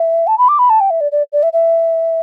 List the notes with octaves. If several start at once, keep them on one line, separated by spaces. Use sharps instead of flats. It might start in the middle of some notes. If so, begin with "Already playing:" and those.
Already playing: E5
A5
B5
D6
B5
A5
G5
E5
D5
D5
D5
E5
E5